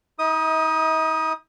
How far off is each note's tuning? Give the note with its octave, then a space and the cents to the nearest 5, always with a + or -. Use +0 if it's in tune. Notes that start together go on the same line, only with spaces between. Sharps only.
D#4 +40 D#5 +45 D#6 +0